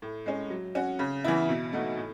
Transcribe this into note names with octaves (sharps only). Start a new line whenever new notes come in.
A2
G#3 C#4
F#3
C#4 F#4
C#3
E3 B3 E4
B2
A3 D#4 F#4
A2